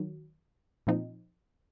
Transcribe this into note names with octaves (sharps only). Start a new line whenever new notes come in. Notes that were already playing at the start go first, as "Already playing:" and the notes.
Already playing: D#3 F#3
A#2 F3 C4 D#4